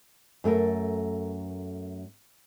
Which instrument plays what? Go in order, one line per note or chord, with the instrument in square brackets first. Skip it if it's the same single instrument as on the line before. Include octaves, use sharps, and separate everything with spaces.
[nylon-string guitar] F#2 A3 A4 A#4